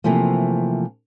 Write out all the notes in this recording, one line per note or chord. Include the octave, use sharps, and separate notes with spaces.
C3 E3 F3 A3 A#3